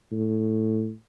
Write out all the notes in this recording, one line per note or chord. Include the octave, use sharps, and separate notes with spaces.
A2